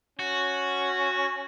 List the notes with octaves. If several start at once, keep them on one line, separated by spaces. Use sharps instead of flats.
C#4 F#4